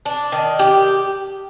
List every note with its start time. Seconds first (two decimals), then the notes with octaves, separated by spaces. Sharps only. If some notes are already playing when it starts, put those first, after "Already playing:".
0.05 D4
0.32 D#3
0.59 G4